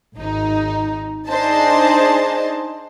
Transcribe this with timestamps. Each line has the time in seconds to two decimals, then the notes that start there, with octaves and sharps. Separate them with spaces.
0.15 G#1 D#4
1.28 D4 D#4 G#4 C5 D#5 A5